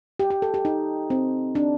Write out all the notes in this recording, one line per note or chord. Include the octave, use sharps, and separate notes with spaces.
G4
G4
A4
G4
D#4
C4
D4